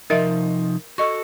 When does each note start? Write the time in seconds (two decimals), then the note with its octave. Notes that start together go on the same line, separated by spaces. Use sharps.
0.10 C3 F3 D#4 A#4 D#5 E5
0.98 F#4 A4 D#5 C#6